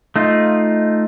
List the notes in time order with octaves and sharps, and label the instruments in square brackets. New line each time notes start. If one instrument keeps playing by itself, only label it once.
[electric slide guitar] A3 D#4 F4